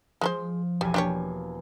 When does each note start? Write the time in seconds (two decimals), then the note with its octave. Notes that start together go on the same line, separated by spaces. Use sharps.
0.21 F3 G#3 A4 C5
0.81 E1 B1 G3 G#5
0.94 A#3 D4 G4 C#5